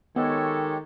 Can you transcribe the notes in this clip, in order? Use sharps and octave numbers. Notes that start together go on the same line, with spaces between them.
D#3 G#3 B3 G4 A4 C#5